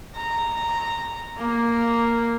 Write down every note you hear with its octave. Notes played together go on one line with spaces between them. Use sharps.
A#5
A#3